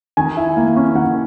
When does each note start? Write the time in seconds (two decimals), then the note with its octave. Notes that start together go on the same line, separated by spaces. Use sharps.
0.17 D#3 G#5
0.37 E4
0.56 A#3
0.76 C#4
0.95 D#3 F#5